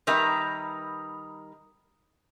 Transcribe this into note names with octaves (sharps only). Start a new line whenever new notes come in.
D#3 G3 A#4 B4 E5